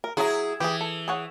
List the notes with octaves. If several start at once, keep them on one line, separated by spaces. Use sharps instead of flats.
A#4
F#3 E4 G#4 A#5
E3 G4 G#4
A4
G#4 C#5 F#5